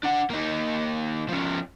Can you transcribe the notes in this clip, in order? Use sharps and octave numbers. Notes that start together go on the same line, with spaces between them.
D4 F#5
A#3 D#4
F3 C#4